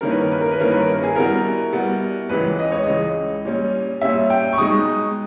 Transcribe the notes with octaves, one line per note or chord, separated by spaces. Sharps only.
G2 D#3 A#3 C#4 E4 A#4
B4
A#4
B4
A#4
B4
G2 D#3 A#3 C#4 E4 A#4
B4
A#4
G#4
B2 G3 B3 E4 A#4
B2 G3 B3 E4
C#2 C#3 E3 G#3 B4
D#5
C#5
C#2 C#3 E3 G#3 D#5
A#2 G3 C#4
A#2 G3 C#4 E5
G5
C#6
B2 G#3 D#4 D#6